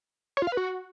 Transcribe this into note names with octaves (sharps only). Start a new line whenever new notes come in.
C#5
F4
F5
B4
F#4